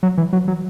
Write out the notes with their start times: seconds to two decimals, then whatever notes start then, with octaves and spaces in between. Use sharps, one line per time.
0.03 F#3
0.18 E3
0.33 F#3
0.48 F#3